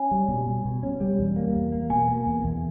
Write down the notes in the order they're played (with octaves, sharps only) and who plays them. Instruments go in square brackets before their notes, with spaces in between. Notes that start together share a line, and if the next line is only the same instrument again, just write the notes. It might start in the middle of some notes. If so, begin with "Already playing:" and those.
Already playing: [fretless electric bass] C#4 [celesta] G#5
[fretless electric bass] G3
B2
B2
B2
C#4
G3
E2
A#3
E2
A#3
[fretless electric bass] B2 [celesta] G#5
[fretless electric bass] A#3
E2
E2